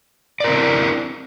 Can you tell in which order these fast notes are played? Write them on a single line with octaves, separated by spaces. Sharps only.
D5 A#4 C4 E4 D4